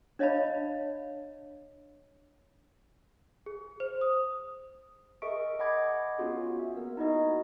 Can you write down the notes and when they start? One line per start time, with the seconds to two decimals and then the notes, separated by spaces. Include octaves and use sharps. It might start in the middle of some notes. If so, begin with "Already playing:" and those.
0.19 D4 C#5 D#5 F5 A5 B5
3.46 G#4
3.80 C5
4.01 D#6
5.22 G#4 A#4 D#5 E5 C#6 D7
5.59 D#5 F#5 G#5 B5 D6 G#6
6.18 B3 C#4 F4 F#4 G#4
6.59 E5
6.77 A#3 B3 A#4
6.97 D#4 E4 F#4 D#5